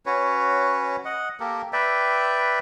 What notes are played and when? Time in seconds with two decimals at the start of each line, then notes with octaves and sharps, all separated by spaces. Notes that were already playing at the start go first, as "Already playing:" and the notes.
0.06 C#4 F#4 B4 C#5
1.05 D#5 F#5
1.40 A#3 G4 A4 A#4
1.73 B4 D5 E5 G5